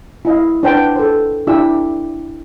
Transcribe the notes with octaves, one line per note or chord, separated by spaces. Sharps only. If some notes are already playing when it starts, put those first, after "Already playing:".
E4 D#5 F5
D4 B4 C5 F#5 G5 A5
A4 C5
D4 E4 G4 E5 E6